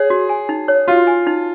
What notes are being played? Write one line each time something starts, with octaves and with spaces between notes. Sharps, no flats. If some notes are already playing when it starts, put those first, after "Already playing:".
Already playing: G#4 C#5
F#4
G#5
D#4
C#5
F4 F#4
G#5
D#4